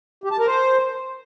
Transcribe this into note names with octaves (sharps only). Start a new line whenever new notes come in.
G4
A5
A#4
C5